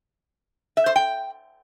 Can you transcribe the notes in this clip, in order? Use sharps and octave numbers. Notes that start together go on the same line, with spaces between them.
E5
C5
G5